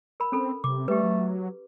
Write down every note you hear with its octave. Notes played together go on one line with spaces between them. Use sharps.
A#4 B5
C4 C#4 A4 B5
C3 D6
G3 A3 G4 B4
F#3